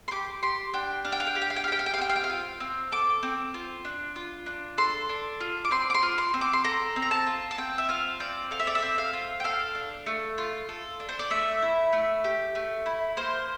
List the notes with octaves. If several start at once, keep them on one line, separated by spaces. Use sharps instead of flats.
C6
G4 D6
G4 C6
D4 G5
D4 F5
G5
F5
G5
G4 F5
G5
F5
G5
F5
G4 G5
F5
G5
F5
C4 G5
F5
G5
F5
F4
C4
A4 D6
C4
F4
D4
F4
D4
A4 C6
D4
F4
D6
C4 C6
D6
C6
F4
C6
C4
D6
C6
A4 A#5
C4
A#5
A5
F4
A5
C4 G5
E5
F4 F5
C4 D5
A4 F5
E5
D5
E5
C4
F5
F4
G5
A4 F5
D4
A3
F4
A4
D4
C5
D5
A3 E5
E4
A3
G4
A3
E4
A#3 C5